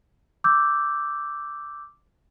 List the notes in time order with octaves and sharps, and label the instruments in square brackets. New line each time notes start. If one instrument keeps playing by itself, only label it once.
[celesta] D6 E6 G6